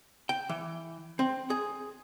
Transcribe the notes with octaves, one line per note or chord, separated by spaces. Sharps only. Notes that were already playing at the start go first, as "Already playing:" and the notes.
G5
E3
C4
G#4